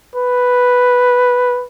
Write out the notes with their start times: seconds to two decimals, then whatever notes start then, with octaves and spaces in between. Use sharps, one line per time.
0.15 B4